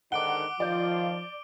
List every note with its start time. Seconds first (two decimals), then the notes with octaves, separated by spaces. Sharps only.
0.12 G#2 D3 D#3 F#5 D6 D7 G7
0.60 D#3 F3 F4 D5 G6